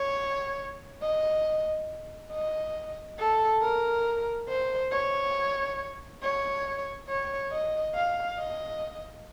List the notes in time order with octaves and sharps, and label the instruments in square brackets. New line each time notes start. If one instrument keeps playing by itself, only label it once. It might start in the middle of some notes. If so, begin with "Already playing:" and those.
Already playing: [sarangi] C#5
D#5
D#5
A4
A#4
C5
C#5
C#5
C#5
D#5
F5
D#5